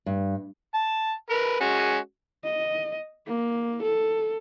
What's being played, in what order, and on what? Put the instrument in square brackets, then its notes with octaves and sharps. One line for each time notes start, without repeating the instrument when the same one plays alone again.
[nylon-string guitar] G2
[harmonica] A5
A#4 B4
G#3 C#4 F#4
[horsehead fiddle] D#5
A#3
A4